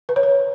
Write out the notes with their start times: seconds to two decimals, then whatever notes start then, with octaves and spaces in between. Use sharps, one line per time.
0.09 B4
0.16 C#5
0.23 B4